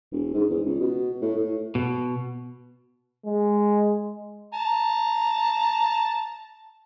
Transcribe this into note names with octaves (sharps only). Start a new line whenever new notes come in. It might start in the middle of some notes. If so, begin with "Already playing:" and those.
E1
G#2
E2
C#2
B2
A2
A2
B2
G#3
A5 A#5